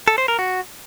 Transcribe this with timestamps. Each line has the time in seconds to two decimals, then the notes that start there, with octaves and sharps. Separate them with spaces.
0.08 A4
0.18 C5
0.28 A#4
0.39 F#4